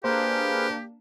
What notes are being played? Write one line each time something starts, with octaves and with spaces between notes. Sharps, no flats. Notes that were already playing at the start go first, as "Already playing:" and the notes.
A#3 D4 G4 G#4 B4 C5 F5 A#5